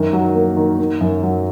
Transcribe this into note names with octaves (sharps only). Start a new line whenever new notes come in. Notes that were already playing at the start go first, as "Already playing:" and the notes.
Already playing: F#2 D#3
F#3
A#3
D#3
D#3
F#2
F#3